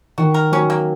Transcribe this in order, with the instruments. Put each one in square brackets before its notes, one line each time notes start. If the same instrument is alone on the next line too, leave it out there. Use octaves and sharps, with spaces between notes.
[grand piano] D#3 [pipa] F#4
[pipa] A#4
[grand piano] F#3 [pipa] C#4
[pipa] A#3